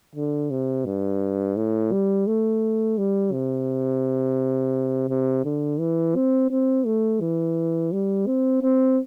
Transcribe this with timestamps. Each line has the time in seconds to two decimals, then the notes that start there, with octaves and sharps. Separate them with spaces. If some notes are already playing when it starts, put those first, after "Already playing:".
0.15 D3
0.51 C3
0.85 G2
1.57 A2
1.92 G3
2.27 A3
2.98 G3
3.32 C3
5.09 C3
5.45 D3
5.80 E3
6.16 C4
6.51 C4
6.86 A3
7.21 E3
7.92 G3
8.27 C4
8.62 C4